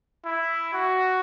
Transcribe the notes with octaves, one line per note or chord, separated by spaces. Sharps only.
E4
F#4